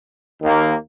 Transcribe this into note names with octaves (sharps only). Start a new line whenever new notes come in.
D#2 D#3 A#3